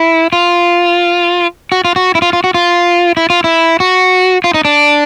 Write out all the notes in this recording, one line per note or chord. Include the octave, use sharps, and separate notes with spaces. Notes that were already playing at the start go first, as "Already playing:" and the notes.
Already playing: E4
F4
F#4
F4
F#4
E4
F4
F4
F#4
F4
E4
F4
E4
F#4
F4
D#4
D4